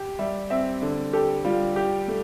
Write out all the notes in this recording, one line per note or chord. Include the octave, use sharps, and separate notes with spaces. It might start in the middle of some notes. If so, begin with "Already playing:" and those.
Already playing: G4
G3 E5
C4 E5
D3
G4 A4
G3 F4
G4
A3